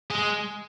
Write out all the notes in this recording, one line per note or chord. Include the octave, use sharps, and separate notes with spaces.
G#3